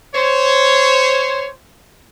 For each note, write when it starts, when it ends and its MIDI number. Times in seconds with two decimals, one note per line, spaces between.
0.15 1.48 72
0.15 1.48 73